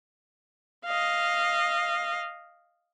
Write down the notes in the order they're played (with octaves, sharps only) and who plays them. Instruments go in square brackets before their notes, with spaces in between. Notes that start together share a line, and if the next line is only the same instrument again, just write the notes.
[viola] D#5 F5